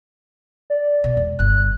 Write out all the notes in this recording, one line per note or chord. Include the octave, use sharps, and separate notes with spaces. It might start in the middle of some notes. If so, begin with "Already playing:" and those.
D5
B2
E1
G1 D3 F#6